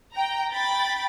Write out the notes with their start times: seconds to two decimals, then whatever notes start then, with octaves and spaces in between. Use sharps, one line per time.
0.12 G5 A#5
0.53 G5 B5 A6